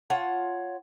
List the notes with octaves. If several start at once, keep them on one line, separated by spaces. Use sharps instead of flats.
F4 C#5 F#5 A5